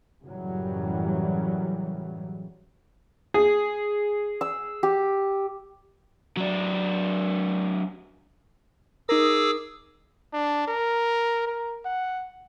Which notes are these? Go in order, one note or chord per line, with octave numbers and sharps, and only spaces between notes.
F#2 A2 C#3 E3 F#3 G3
G#4
E6
G4
F#3 D4
D#4 G#4 A#4 D6 E6
D4
A#4
A#4
F#5